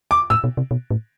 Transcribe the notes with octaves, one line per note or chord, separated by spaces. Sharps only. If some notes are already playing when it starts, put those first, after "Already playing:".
D6
A2 E6
B2
C3
B2
A2